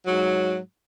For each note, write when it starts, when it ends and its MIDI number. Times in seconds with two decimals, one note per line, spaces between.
0.06 0.57 44
0.06 0.57 54